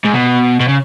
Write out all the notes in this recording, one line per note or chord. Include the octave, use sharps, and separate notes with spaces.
G#2
B2
B2
C#3